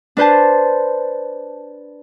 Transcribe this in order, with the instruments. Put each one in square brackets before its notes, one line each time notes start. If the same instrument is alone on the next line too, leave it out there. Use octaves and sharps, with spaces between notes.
[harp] D4 B4 C5 A5